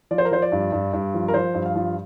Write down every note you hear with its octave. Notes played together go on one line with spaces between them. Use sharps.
F3 D5
C5
A#4
F3 C5
D5
G2
G2
G2
F3
A#4
F3 C5
G2
F5
F3